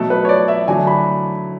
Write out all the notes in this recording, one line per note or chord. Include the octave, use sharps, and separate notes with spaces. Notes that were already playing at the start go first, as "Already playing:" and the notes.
Already playing: B2 F#3 A3 A4
B4
C#5
D5
E5
D3 F#3 A3 G#5
B5